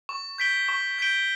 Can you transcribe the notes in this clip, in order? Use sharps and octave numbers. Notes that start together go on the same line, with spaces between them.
C#6
G6 B6 D7 G7
C#6
G6 B6 D7 G7